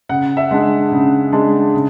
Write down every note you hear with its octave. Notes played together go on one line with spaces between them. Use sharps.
C#3 F#5
E5
G#3 D4
C#3
G#3 D4
C#3